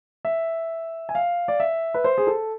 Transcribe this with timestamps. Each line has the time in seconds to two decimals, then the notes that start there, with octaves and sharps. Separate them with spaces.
0.25 E5
1.09 G#5
1.15 F5
1.48 D5
1.60 E5
1.94 B4
2.04 C5
2.18 G#4
2.27 A4